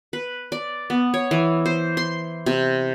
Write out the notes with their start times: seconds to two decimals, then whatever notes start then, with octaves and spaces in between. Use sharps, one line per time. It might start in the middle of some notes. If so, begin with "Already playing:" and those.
0.13 B4
0.52 D5
0.90 B3
1.14 C#5
1.31 E3
1.66 C5
1.97 C6
2.46 C3